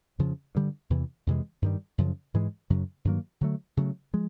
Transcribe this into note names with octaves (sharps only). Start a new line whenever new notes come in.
F2 C#3 F3
G2 D3 G3
E2 C3 E3
F2 C3 E3 G#3
G2 D#3 G3
F#2 C#3 F3
G#2 E3 G#3
F#2 C#3 F#3
G2 D#3 F#3 A#3
D3 F#3 A3
C#3 F#3 A3
F3 G#3